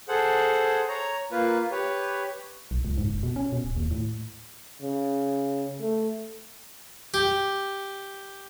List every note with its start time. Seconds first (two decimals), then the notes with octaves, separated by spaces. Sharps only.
0.08 G#4 A4 C5 F#5
0.88 C#5 A#5
1.32 A#3 F4 B4
1.71 G4 B4 C#5
2.71 B1
2.85 C#2
2.98 G#2
3.10 F#1
3.23 B2
3.36 C#4
3.52 B2
3.65 D1
3.77 D#2
3.91 A2
4.81 C#3
5.80 A3
7.14 G4